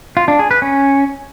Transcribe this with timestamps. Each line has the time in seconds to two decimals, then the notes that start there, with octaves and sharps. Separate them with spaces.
0.17 F4
0.28 D4
0.39 G#4
0.51 B4
0.62 C#4